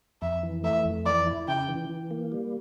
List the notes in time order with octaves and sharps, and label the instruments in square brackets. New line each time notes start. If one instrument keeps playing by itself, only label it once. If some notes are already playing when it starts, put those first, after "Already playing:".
[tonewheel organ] F2 [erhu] E5
[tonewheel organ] E3
[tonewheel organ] A3 [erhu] E5
[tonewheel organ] F2
[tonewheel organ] E3 [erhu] D5
[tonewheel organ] E4
[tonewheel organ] C#3 [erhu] G5
[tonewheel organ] E3
E3
A#3
G3